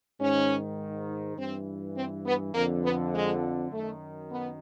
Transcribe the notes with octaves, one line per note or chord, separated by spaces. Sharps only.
G#2 D#3 C#4
G2 E3 C4
C4
B3
F2 D3 A#3
B3
G#3
F#2 D#3 A3
B3